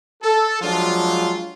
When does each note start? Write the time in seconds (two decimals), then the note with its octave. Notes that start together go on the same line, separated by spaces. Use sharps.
0.23 A4
0.61 F3 F#3 G#3 D4 F4